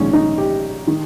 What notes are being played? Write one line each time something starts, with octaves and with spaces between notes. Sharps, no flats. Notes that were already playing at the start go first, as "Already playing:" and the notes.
Already playing: A#1 G#2 D#3 C#4
D#4
G4
D#3